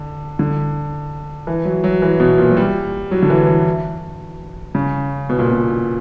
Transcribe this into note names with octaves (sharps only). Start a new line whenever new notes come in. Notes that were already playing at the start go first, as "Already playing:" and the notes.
Already playing: D3
D3
E3
F#3
F#3
E3
B2
A#2
F#3
G3
F#3
D3
E3
E3
C#3
B2
A#2
B2